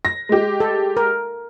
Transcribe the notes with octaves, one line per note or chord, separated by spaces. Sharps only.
A#6
G#3 G4
A4
A#4